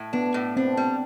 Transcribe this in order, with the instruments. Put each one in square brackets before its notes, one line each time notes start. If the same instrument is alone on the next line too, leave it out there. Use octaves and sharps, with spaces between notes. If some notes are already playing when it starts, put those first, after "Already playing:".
Already playing: [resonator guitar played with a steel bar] A2
[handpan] B3 [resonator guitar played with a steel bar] D4
[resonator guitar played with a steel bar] A2
[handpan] C4 [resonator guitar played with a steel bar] D4
[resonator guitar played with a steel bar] G3